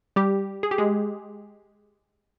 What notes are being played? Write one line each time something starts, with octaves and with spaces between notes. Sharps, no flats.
G3 G4
G#4
G4
G#3 G#4